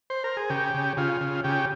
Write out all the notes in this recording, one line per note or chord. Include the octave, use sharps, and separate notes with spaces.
C5
A#4
G#4
C#3 G4
C#3
C#3 F4
C#3
C#3 G4